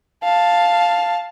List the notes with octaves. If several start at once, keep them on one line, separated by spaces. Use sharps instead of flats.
F5 A5